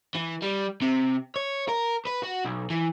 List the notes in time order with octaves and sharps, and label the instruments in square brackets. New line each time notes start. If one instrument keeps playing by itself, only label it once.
[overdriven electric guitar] E3
G3
C3
C#5
A#4
B4
F#4
B1
E3